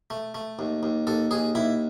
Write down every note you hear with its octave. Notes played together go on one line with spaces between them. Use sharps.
A3
A3
D#2
D#2
D#2 A4
D#2 G#4
D#2 E4